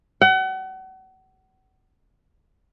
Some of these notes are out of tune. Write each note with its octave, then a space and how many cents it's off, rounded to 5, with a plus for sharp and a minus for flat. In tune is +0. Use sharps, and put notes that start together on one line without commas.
F#5 +35